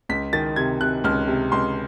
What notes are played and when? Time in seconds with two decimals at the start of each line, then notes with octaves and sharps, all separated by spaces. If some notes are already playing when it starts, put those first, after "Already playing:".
0.09 C#2 B6
0.33 D#3 A6
0.56 C3 G#6
0.81 C3 F#6
1.04 C#2 F6
1.28 C3
1.52 C#2 C6